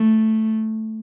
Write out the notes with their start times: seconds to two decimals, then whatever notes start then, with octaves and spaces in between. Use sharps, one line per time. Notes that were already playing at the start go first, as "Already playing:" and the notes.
Already playing: A3